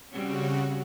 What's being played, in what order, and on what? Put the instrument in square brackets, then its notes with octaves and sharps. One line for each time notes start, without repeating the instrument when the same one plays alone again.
[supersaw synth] C#3 F#4 [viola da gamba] G3 C4 C#4